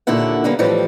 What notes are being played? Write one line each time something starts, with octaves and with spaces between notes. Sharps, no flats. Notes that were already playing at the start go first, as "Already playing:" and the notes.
D#2 A#2 D3 D4 E4 F#5
D3 G3 A#3 B3
A2 E3 F3 G3